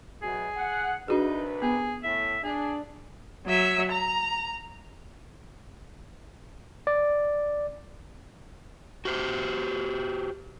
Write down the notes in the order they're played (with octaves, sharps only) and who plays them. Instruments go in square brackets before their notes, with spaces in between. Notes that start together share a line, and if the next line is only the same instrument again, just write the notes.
[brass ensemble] F#2 B2 F#3 [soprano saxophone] G#4
[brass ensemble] F#5
[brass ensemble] C2 B4 [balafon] D4 F#4 G#4 [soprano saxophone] D#4
[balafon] B3 [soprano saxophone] G#4
[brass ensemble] A2 [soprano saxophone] E5
[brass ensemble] D4 [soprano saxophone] G#4
[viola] F#3 E5
A#5
[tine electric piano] D5
[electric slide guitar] F#4 G4 C5